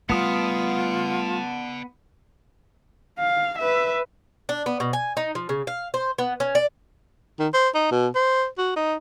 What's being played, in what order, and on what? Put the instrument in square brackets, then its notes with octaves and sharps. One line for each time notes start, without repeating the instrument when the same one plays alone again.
[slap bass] G3 A3 [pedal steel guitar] B3 D#6 [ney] F4 [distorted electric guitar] F#5 A5
[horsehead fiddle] F5
B4 E5
[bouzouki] D4
B3
B2
G#5
D#4
F3
C#3
F5
C5
B3
C#4
D5
[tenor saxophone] D#3
C5
D#4
B2
C5
F#4
D#4